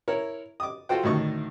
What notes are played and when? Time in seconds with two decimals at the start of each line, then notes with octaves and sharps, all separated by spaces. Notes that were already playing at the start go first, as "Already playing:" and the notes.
0.08 E4 A#4 C#5
0.60 D6 D#6
0.89 F4 F#4 A4 C5 G5
1.03 D2 A2 D#3 C#6